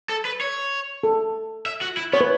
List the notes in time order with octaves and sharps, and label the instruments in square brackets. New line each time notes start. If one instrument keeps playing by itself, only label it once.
[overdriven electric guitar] A4
B4
C#5
[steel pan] A4
[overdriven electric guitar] E5
F#4
E4
[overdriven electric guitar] B3 [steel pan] C#5
[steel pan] B4